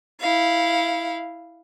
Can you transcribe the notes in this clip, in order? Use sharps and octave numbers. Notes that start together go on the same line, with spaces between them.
E4 F5